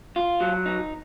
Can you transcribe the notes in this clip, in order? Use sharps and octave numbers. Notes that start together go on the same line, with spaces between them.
F4
F#3
D#4